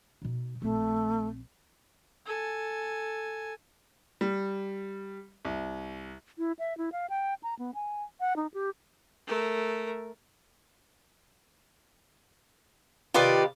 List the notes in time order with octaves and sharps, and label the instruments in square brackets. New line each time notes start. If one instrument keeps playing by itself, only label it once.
[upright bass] B2 D#4
[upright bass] A#1 C4 [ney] A3
[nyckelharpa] A4 G#5
[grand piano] G3
C2
[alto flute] E4
E5
E4
F5
G5
A#5
B3
G#5
F#5
D#4
G4
[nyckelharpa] A3 A#4
[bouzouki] C3 D#3 G4 [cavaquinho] F4 B4 D5